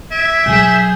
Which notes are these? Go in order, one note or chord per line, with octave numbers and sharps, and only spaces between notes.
E5 G#6 D7
B2 F#3 G#4 G6